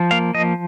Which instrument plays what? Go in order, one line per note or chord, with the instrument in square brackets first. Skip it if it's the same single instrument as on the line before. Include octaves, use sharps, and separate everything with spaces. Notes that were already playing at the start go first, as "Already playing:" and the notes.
Already playing: [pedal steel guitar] F3
A#3 F5
F3 D#5